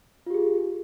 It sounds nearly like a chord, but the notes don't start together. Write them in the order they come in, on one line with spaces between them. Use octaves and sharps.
F4 G4 G#4